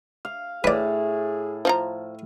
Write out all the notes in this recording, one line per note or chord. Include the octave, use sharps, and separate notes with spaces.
F5
A2 G#4 B4 D5
F3 F4 A#5